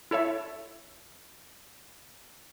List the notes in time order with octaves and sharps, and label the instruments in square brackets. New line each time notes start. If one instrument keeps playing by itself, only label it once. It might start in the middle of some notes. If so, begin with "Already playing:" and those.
[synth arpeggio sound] E4 A4 C#5 E5